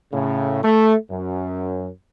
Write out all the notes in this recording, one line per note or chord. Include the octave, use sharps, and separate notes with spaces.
A2 C#3
A3
F#2